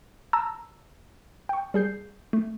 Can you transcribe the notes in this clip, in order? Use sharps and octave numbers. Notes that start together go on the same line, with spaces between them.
A5 A#5 E6
G5 C#6
G3 G#4 G6 C7
A3